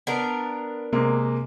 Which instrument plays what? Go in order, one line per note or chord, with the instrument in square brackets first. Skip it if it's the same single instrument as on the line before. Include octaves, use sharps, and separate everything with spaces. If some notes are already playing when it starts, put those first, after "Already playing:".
[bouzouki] B3 D4 A#4
[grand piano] C3 G#3 A#3